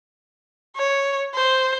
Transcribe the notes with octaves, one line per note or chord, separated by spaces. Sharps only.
C#5
C5